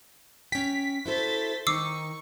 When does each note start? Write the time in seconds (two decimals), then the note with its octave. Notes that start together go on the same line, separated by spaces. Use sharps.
0.52 C#4 G5 B6
1.06 E4 F#4 A4 C5 A6
1.67 D#3 D#4 C#6 D6 E6 C7